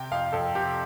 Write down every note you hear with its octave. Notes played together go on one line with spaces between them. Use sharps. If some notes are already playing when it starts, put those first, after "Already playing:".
Already playing: C3 G5
F2 F5
F2 A4
C3 G4